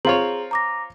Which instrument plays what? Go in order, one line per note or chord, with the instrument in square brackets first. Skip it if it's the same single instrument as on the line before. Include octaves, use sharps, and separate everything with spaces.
[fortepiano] C4 F4 C#5 [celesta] G#4 A#5 F#7
[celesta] A#5 D6 A#6